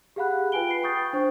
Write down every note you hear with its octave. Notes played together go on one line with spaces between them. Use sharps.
G4 G#4 F5 F#5 B5 F#6
F4 B4 G5 G#5 D7 G7
B5 C7
G5 C#6 D#6 G6 A6
D4 C5 G5 C#6